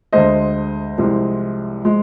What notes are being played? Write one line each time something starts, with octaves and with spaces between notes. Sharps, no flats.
D2 D3 G#3 C5 D#5
C2 C3 F3 G#3
F3 G#3